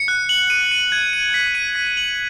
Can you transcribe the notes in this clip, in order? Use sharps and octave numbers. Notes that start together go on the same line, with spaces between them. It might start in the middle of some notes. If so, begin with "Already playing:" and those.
Already playing: C#7
F#6
F#7
D#7
D#7
G#6
D#7
B6
D#7
B6
F#7